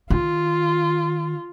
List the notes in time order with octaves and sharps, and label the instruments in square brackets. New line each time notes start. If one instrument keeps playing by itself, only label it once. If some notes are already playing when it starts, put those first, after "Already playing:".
[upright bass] D#3 [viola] F4